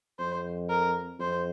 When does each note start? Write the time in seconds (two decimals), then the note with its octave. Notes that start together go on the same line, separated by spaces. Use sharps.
0.19 F2 C5
0.70 A#4
1.19 F2 C5